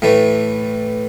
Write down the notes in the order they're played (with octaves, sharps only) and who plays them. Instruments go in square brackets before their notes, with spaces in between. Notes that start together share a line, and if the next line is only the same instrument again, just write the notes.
[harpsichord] A2 E3 A3